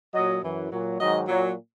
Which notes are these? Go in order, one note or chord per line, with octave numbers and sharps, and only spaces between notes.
A#2 F#3 D#5
F#2 E3
A#2 F#3
G#2 D#3 F#3 D#5
A#2 F#3